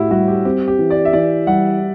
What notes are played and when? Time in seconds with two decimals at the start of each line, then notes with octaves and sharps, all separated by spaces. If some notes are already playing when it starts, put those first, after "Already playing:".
Already playing: A2 E4 F#4 G4
0.11 G3 F#4
0.28 G4
0.45 C4 G4
0.68 G4
0.79 E3
0.90 D5
1.05 E5
1.13 E3 D5
1.47 G3 F#5